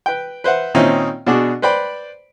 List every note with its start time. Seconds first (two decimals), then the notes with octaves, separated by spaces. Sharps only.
0.06 B4 G5
0.44 B4 C5 E5 F#5
0.74 A#2 D#3 C4 C#4 D#4 E4
1.27 B2 D4 F#4 G#4 D6
1.62 B4 C5 D5 G5 B5